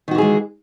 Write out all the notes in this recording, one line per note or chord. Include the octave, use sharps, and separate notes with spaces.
D#3 E3 G#3 F#4 G#4